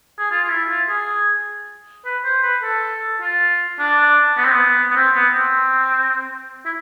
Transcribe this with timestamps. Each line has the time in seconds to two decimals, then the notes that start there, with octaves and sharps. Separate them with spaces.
0.19 G#4
0.31 F4
0.44 F4
0.50 E4
0.70 F4
0.89 G#4
2.05 B4
2.25 C5
2.43 B4
2.63 A4
3.21 F4
3.79 D4
4.37 B3
4.45 C4
4.52 B3
4.91 B3
4.96 C4
5.15 B3
5.34 C4
6.65 E4